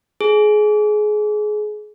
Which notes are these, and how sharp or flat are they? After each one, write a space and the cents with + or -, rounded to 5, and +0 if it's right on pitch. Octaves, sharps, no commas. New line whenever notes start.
G#4 +25